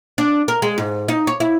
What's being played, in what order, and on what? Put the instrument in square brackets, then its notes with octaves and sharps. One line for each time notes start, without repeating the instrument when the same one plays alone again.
[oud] D4
A#4
G#3
G#2
D#4
C#5
E4